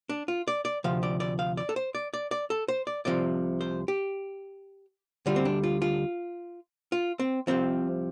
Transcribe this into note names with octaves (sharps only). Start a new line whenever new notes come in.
D4
F4
D5
D5
D2 C3 F3 F5
D5
D5
F5
D5
A4
C5
D5
D5
D5
A4
C5
D5
C2 C3 F3 D5
C5
G4
D2 D3 G3 F4
C4
D4
F4
F4
F4
C4
C2 C3 F3 C4